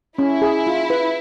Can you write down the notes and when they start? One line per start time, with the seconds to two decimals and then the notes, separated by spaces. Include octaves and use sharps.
0.18 C#4 E4
0.42 G#4
0.67 F4
0.90 B4